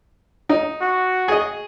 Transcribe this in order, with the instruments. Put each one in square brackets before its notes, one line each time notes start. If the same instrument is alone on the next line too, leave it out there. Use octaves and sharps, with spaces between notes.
[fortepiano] D#4
[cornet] F#4
[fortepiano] G#4 D#5